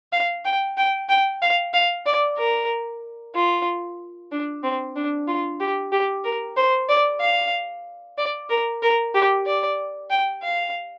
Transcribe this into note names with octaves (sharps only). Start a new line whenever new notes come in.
F5
G5
G5
G5
F5
F5
D5
A#4
F4
D4
C4
D4
F4
G4
G4
A#4
C5
D5
F5
D5
A#4
A#4
G4
D5
G5
F5